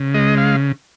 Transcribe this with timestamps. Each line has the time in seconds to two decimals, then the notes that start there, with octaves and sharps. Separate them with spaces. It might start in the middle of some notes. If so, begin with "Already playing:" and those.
Already playing: C#3
0.14 G#3 D#5
0.37 F5